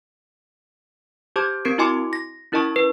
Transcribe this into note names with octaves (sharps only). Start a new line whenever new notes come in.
G4 C5 A5 D6 G6 G#6
C4 A#4 G#6 C7 D7
E4 F#4 D#5 G#5 C6 D6
A#6
C#4 E4 A#4 D#5 A5 C#6
B4